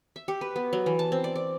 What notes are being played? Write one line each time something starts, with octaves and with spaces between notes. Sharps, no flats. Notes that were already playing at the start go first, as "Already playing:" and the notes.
E5
G4
B4
B3
F#3
E3
A5
C4
D5
D5